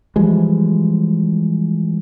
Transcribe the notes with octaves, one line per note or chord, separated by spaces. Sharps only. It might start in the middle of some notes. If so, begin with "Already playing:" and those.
E3 F3 G3 G#3